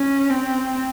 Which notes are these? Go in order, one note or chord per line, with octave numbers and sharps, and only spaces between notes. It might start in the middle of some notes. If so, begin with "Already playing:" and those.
Already playing: C#4
C4